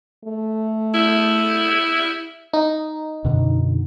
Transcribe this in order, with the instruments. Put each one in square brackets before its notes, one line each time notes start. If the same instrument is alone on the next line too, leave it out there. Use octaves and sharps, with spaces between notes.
[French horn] A3
[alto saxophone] E4
[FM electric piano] D#4
[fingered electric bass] F#2 B2 D3